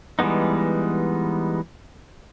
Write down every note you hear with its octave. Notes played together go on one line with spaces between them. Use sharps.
E3 G3 G#3 B3 D#4